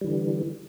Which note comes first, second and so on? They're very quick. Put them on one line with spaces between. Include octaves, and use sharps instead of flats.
G3 E3 D3